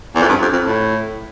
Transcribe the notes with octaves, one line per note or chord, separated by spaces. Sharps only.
E2
F2
G2
F2
F2
A2